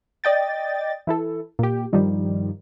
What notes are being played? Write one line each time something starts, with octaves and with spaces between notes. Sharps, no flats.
D5 D#5 G5 A6
E3 E4 A4
A#2 G4
G2 D#3 F3 G3